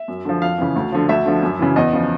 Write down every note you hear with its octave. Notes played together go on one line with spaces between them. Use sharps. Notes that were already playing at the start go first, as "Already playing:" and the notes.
Already playing: E5
F#2
D3 F3
F2 F5
C#3 E3
D2
D3 F3
D2 E5
D3 F3
F#2
C#3 E3
E2 D#5
C#3 F3